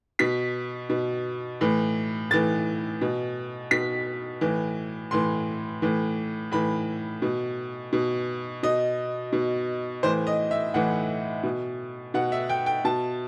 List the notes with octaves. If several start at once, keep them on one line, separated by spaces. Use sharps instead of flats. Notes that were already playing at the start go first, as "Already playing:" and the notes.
B2 B6
B2
A2 E3
A2 E3 A6
B2
B2 B6
A2 E3
A2 E3 C6
A2 E3
A2 E3 B5
B2
B2
B2 D#5
B2
A2 E3 C5
D#5
E5
A2 E3 F#5
B2
B2 F#5
E5
G5
G5
B2 A5